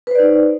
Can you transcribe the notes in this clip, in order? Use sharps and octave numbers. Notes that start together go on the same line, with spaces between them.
D#4 B4 C5 D5